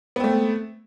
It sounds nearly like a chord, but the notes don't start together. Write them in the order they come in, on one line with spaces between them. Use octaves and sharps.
B3 C4 A3